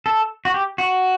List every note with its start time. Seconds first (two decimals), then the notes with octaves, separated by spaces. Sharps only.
0.06 A4
0.45 F#4
0.54 G4
0.78 F#4